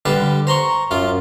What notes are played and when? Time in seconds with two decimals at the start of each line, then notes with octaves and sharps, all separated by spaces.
0.05 D3 G3 B4 F5 A5
0.47 C5 A#5 C6 C#6
0.91 F#2 F4 F5